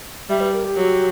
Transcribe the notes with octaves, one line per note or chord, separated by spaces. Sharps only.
G3 E5
B4
A#4
G4
F#3